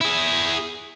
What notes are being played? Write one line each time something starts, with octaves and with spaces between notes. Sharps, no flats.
E4 G#4